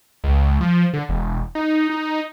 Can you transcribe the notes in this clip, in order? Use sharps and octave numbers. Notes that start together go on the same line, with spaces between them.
C#2
F3
D3
E1
D#4
D#4